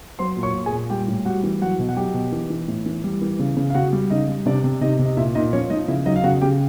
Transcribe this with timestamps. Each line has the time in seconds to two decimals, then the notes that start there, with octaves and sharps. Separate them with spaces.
0.19 F#3 C5 C6
0.37 A#2
0.43 C#5 C#6
0.54 A#2
0.66 G#4 G#5
0.72 A#2
0.90 G3 G4 G5
1.08 A2
1.26 G3 F#4 F#5
1.43 E3
1.61 F#3 F#4 F#5
1.79 B2
1.89 F#5
1.97 F#3 G4 G5
2.14 B2
2.32 E3
2.50 E3
2.68 A2
2.86 E3
3.04 G3
3.21 E3
3.39 C#3
3.57 C#3
3.70 F5
3.75 C#3 F#4 F#5
3.92 G3
4.10 C#3 D#4 D#5
4.28 G3
4.46 C3 D4 D5
4.64 C3
4.81 C3 D#4 D#5
4.99 C3
5.05 D#5
5.17 A#2 E4 E5
5.35 A#2 D#4 D#5
5.53 F3 C#4 C#5
5.70 F3 D#4 D#5
5.88 C#3 E4 E5
6.06 F#3 D#4 D#5
6.16 F5
6.24 C#3 F#4 F#5
6.41 C#3 G4 G5